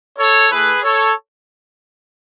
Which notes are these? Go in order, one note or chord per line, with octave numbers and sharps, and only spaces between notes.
A4 C#5
A3 E4 G#4 B4
A4 C#5